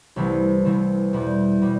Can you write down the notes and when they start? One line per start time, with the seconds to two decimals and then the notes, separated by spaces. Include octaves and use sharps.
0.16 C2 C3 E3 A3
0.65 C2 C3 E3 A3
1.13 E2 B2 G3
1.62 B2 G3